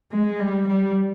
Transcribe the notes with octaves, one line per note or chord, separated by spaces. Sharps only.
G#3
G3
G3